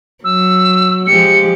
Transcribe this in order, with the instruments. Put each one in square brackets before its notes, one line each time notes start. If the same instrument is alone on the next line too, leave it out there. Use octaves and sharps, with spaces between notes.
[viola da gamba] F#3 [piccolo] E6
[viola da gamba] F3 G#3 G4 [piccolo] C#7